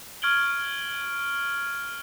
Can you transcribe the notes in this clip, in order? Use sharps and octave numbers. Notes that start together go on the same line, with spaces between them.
C#6 F6 G#6 D7 F#7 G7